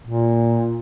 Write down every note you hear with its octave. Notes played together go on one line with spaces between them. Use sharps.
A#2